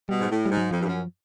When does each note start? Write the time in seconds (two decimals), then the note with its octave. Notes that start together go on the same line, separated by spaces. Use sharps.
0.09 B2 G3
0.20 G#2
0.30 A2
0.45 G#2 G3
0.57 F#3
0.71 F2 F3
0.82 G2
0.85 F#2